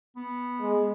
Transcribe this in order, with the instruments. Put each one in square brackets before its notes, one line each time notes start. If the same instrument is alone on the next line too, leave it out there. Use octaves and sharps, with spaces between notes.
[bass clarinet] B3
[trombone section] G#3